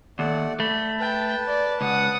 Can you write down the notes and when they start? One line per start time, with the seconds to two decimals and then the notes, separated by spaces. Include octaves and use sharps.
0.19 D#2 A3 D5 F#5
0.60 A3 B5
1.00 B4 G5 A5
1.48 D5
1.81 C#2 F#5 D#6